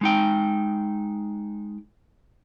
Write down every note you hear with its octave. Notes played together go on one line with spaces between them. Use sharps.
G#3 D#4 G5